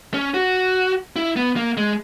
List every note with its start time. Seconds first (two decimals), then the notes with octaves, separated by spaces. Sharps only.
0.14 C#4
0.34 F#4
1.16 E4
1.36 B3
1.56 A#3
1.77 G#3